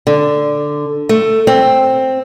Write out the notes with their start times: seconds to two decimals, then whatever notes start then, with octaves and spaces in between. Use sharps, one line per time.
0.07 D3
1.09 A3
1.47 C4